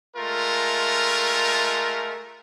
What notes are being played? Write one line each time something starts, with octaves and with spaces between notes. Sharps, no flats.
G#3 A3 F4 A#4